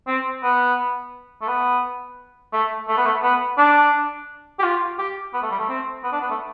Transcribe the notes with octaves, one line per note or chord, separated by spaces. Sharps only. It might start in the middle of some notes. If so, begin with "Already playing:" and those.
C4
B3
A3
B3
A3
A3
B3
A3
B3
D4
G4
F4
G4
B3
A3
G3
A3
C4
B3
D4
B3
A3